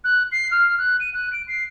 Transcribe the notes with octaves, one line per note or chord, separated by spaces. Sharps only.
F#6
C7
F6
F#6
D#7
F#6
D7
C7